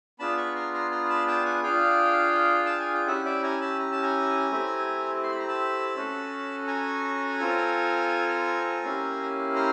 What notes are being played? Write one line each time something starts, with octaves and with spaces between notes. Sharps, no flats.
B3 D4 F4 G#4 A5 B5
B5 C#6
A#5 C6
A#5 C6
A#5 C6
C6
A5 B5
G5 A5
F#5 G#5
D4 F4 G#4 F5 G5
A5
G#5
G5
C#4 E4 G4 E5 F#5
D5 E5
G#5 A#5
A5 B5
A#5
A5
G#5 A#5
A3 C4 E4 G4
C6
B5
A#5
A5 B5
C#4 F#4 A4
G#5 A#5
C4 F4 A4
A#3 C#4 E4 G4
A#5 C6